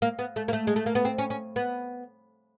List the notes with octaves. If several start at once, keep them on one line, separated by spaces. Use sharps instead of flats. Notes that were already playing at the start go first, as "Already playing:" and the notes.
A#3
B3
A3
A#3
A3
G#3
A3
A#3
B3
C4
C#4
C#4
B3